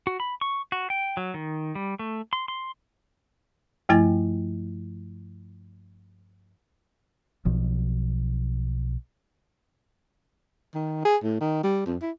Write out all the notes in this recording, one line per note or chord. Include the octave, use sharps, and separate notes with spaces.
F#4
B5
C#6
F#4
G5
F#3
D#3
G3
A3
C6
C6
G2 F3 A3 E4 G#5 A6
B1 B2 F3
D#3
G#4
A2
D#3
G3
F2
E4